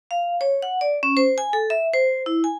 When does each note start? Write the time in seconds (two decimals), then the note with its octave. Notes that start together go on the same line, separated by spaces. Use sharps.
0.11 F5
0.41 C#5
0.62 F#5
0.81 D5
1.03 C#4
1.17 C5
1.38 G#5
1.53 A4
1.70 E5
1.93 C5
2.26 E4
2.44 G#5